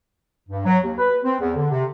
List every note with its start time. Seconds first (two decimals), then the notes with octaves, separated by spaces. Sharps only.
0.49 G2
0.65 F#3
0.83 D#2
0.98 B4
1.24 C4
1.41 E2
1.55 D3
1.71 C3